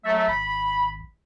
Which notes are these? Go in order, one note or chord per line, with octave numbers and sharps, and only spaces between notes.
F#3 A3 E5
G#1 B5